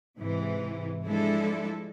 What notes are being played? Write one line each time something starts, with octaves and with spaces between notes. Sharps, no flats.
G#2 C3 E3
F3 G#3 D4 E4 A4